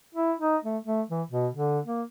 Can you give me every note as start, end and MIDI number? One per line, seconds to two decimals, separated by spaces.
0.15 0.32 64
0.40 0.57 63
0.64 0.78 57
0.85 1.02 57
1.10 1.23 52
1.31 1.48 47
1.53 1.79 50
1.86 2.03 58